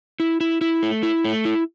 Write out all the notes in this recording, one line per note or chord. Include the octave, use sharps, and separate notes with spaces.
E4
E4
E4
A3
E4
A3
E4